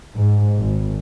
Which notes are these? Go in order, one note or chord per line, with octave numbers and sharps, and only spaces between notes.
G#2
G#1